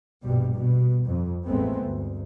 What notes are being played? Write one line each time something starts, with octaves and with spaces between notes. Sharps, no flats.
A#1 G2 B2 G3
B2
F2
A1 E2 G#3 A3 B3 C4
G1 D2